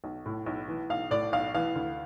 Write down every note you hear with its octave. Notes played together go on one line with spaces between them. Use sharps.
B1
A2
B1
E3
B1 F5
A2 D5
B1 F5
E3 F5
D2